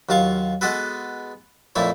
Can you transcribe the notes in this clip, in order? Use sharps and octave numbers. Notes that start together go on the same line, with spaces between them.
D#2 F#3 F4 F5 C#6
G#3 B3 F#4 G#4 A4 B4
F2 A#2 A3 E4 C#5